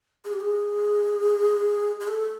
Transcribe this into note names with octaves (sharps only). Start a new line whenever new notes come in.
G#4
G4
G#4
G#4
A4